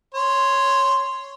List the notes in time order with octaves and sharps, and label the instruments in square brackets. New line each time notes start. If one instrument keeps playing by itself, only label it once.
[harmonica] C#5 C6